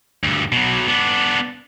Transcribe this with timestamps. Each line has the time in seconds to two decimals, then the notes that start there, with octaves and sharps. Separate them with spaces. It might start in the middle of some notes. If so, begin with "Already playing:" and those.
0.24 D2 G2
0.52 B2 F#3
0.88 B3 D4